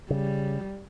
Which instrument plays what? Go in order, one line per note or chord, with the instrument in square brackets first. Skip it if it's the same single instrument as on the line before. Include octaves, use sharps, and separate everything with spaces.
[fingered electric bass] C#3 [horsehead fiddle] G3